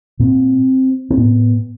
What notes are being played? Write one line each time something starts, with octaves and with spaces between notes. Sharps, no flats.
A#2 C4
C4
A2 B3